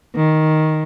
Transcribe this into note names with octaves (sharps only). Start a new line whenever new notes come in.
D#3